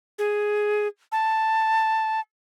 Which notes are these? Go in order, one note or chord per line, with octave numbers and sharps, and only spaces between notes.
G#4
A5